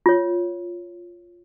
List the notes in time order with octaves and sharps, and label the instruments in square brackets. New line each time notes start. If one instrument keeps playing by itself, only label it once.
[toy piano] F4 C#5